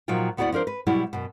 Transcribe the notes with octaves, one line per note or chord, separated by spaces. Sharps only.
A#2 F3 F#3 D#4 F4 G5
D2 B3 E4 F#4 D5 F#5
F3 D4 A#4 C5
B4
B2 F#3 G3 E4 G4
F#2 B2